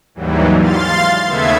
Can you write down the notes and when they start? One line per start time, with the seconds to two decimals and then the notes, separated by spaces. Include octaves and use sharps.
0.15 D#2 G#2 E3 F#3 G3
0.60 F5 C6 A6
1.27 D#2 C#3 A3 B3 E5 G#6